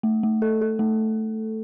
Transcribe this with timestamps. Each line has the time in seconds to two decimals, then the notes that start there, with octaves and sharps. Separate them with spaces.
0.03 A3
0.23 A3
0.42 A4
0.61 A4
0.79 A3